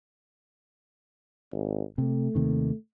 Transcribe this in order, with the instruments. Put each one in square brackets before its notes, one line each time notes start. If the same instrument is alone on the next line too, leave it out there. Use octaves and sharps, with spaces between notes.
[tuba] G#1
[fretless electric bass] C3 [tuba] A3
[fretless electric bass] D#2 C3 D#3